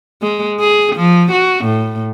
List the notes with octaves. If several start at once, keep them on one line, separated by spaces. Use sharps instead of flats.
G#3
G#4
F3
F#4
A2